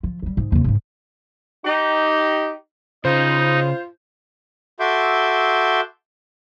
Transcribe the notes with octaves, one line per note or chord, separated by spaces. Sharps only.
F3
C#3 G3
G#2
D#2 C#3
G#2 C#3
D#4 G4
C#3 D#4 F4 C5
F#4 A4 E5 C6 D6 G6